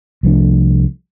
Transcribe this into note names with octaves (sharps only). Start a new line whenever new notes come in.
C2 F3 A3 D4